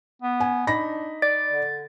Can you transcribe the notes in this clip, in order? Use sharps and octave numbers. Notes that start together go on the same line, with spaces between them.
B3
G#5
D4 D#4 B5 A#6
D5 A6
D3